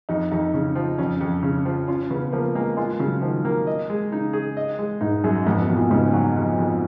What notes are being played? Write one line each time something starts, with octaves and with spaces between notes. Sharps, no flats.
F2 D#4
F2 D#4
C#3
F3
F2 C#4
F2
C#3
F3
C#4 F4
C#3 B3
F3 A#3
G#3 A#3
G#3 F4
C#3 F#3
D#3 F3
A#3
D#5
G#3
C#3 D#4
G#4
D#5
G#3
G#2 D#4
F#2 G#4
F2 G#2
B2
F2
A#2
G#2 C#3
F#3
F2
F2